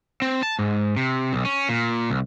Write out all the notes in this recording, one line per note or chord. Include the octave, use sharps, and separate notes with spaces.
C4
A5
G#2
C3
B1
C#4
A#2
C2